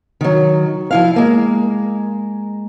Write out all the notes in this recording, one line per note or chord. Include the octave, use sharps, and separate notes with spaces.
D#3 F#3
F3 E4 F5
G#3 A#3